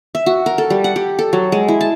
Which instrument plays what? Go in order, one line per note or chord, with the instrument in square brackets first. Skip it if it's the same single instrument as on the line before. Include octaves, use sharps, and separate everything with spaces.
[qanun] E5
F#4
A#4
A4
G3
F#5
G4
A4
F#3
G#3
E4
A5